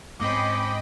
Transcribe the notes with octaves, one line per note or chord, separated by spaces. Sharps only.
G#2 C4 C#4 D#5 G5 B5 D6